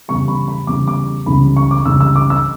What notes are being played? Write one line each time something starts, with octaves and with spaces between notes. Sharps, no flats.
E2 C#3 G3 C#6
B5
B5
E2 C#3 G3 D6
D6
C#2 C#3 E3 G3 B5
C#6
D6
C#2 C#3 E3 G3 E6
E6
D6
E6